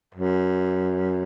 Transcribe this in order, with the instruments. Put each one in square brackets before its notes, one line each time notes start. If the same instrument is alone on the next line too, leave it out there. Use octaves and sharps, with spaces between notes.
[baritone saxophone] F#2